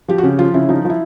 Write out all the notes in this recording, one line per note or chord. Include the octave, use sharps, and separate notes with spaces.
F3 G4
F#4
C#3 G4
F3 F4
C#3 E4
F3 D#4
F3 E4